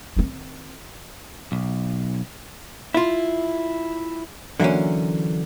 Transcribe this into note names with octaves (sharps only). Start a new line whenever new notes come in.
D#3 C4
B1
E4 F4
D3 E3 F#3 A#3 C#4